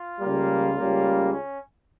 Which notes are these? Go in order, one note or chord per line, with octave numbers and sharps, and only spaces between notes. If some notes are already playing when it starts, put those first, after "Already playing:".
Already playing: F4
C#2 C#3 G3 A#3
C#2 C#3 G3 A#3
C#4